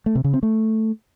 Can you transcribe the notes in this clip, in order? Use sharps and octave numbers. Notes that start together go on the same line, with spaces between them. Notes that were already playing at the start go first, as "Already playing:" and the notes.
A3
C3
C#3
C4
A3